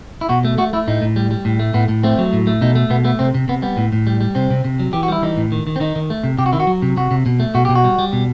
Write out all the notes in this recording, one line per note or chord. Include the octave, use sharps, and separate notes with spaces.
E4
B2 F#4
A3
A3 F#4
A3 E4
A2 D#4
A2
G3
G3
A2
A3
A2 B3
A2
A3 C4
F#3
A2
A3
B2 D#4
A3
B2 B3
A3 B3
C3 C4
C3
C3 B3
G3 B3
A2
A2
G3
G3
C3 C4
C3
C3
F#3
E3 G4
F#4
G3 E4
E3 D#4
A2
D#3
D#3
C4
D#3 D#4
D#3
A3
C3
C3 G4
F#4
D#3 E4
F#4
F#3
C3
C3 F#4
C3
B2
A3
B2 F#4
B2 G4
F#4
G3
G3
B2